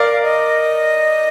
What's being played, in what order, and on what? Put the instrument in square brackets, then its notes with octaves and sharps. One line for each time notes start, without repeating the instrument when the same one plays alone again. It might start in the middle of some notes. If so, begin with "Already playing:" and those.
Already playing: [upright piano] A#4 D5 [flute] F5
[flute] D#5